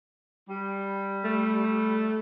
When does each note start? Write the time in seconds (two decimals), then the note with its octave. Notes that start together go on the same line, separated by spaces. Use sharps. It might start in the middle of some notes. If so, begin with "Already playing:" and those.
0.49 G3
1.25 A3